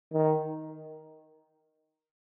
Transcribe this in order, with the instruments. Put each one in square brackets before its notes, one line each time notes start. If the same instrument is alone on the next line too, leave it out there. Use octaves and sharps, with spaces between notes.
[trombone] D#3